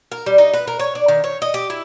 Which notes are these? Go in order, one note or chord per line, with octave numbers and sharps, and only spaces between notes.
A#4
G3
D#4
B4
A#4
C#5
D4
D#3
C#5
D#5
G4
E4